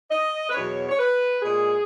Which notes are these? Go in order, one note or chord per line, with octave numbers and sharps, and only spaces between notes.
D#5
B4
E2 B2 F#3 C#5
C#5
B4
A#2 G#3 G#4